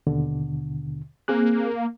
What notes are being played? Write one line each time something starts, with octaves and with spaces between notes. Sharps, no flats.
D#2 B2 D3
A#3 C4 G#4 F#6